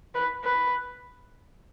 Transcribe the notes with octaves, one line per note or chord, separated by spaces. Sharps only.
B4
B4